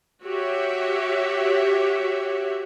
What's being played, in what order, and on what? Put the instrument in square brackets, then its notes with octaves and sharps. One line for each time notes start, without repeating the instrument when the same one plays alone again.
[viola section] F#4 G4 C#5 E5